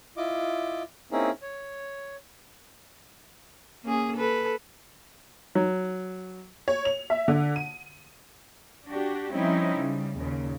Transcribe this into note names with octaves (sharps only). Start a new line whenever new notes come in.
E4 F4 D#5 D6
A#3 C4 C#4 D#4 E4 G#4
C#5
A#3 C#4 G#4
A4 B4
F#3
C#5
F7
E5
D3
D#7
D4 F#4 G4
F3 G3 C4 C#4 D#4 E4
C#3 G3
D#2 A#2 C#3